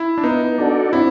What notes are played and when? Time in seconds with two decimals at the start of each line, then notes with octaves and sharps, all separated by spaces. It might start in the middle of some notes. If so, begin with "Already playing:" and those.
Already playing: E4
0.18 D4
0.24 B3 D#4
0.58 D4 F#4 A4 D5
0.93 C4 E4